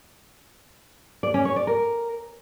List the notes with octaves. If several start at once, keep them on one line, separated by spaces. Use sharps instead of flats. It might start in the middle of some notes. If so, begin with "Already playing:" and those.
D5
C#4
C#5
D5
A#4